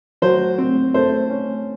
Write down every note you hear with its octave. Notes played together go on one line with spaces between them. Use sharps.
F#3 C5
C4
A3 C5
C#4